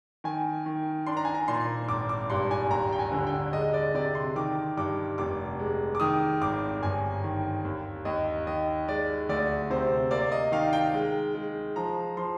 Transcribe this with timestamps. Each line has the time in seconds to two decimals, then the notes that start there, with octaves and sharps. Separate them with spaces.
0.24 D#3 G#5
0.66 D#3
1.07 D4 C6
1.17 A#5
1.25 G#5
1.35 A#5
1.48 A#2 C6
1.89 G#1 D6
2.09 D6
2.30 G2 C6
2.51 G#5
2.71 D#2 A#5
2.92 G5
2.99 G#5
3.12 D3
3.27 G5
3.53 G#3 D#5
3.74 D5
3.94 C3 D5
4.15 C6
4.36 D#3 D6
4.77 G2 D6
5.18 F1 D6
5.59 G#3
5.95 D6
6.00 D#3 D#6
6.41 G#1 D6
6.83 G1 G#5
7.24 D#3
7.65 D#2
8.05 D#2 D#5
8.47 D#3 D#5
8.88 G#3 D5
9.29 D2 D5
9.70 C3 C5
10.11 A#3 D5
10.32 D#5
10.52 D#3 F5
10.73 G5
10.93 G#3
11.35 G#3
11.76 F3 A#5
12.17 F3 C6